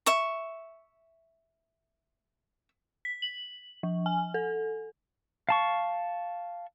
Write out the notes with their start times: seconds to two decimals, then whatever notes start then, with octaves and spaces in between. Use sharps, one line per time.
0.06 E5 C#6
3.05 B6
3.22 F#7
3.83 F3
4.06 G#5
4.34 A4
5.49 F5 A5 C#6